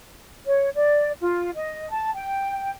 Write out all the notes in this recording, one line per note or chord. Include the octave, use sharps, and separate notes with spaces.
C#5
D5
F4
D#5
A5
G5